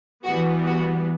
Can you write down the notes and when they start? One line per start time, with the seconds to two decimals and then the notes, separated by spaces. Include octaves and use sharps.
0.24 E3 G3 B3 F#4
0.66 F#4